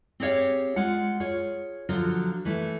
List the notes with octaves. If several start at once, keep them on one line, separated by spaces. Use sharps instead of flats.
C4 G4 G#4 C#5 F5
G#3 F4 F#5
F4 G#4 C#5
D3 F3 F#3 F4 F#4
E3 A3